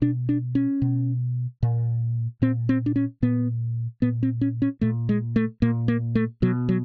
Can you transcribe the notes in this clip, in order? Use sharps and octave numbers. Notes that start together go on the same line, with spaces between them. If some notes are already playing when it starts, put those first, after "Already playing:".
B2 D4
D4
C#4
B2
A#2
A#2 C4
C4
D4
C#4
A#2 B3
A#2 B3
C4
C#4
C#4
A#2 A3
G#3
A3
A#2 A#3
A#3
A3
B2 F#3
F#3